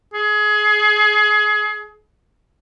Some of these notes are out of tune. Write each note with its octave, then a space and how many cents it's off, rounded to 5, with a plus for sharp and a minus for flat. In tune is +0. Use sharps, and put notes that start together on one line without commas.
G#4 +25